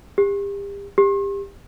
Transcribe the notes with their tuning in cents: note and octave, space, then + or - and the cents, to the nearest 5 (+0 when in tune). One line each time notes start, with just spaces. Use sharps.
G4 +35
G4 +25